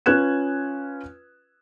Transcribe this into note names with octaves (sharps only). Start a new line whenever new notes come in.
C#4 F4 B4 F#6 G#6 E7